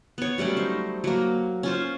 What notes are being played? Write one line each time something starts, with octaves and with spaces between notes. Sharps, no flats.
B3 C#5
F#3 G3 A3 C#4
D#4 C5
F#3 A#3
C#4 F4 C5